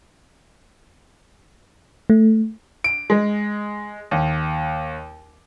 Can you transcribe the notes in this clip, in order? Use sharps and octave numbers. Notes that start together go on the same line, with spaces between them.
A3
D7
G#3
D#2